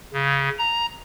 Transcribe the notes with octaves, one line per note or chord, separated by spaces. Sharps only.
C#3
A#5